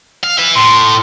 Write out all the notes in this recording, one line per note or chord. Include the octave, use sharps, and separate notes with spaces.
F5
B4 E5
A2 C6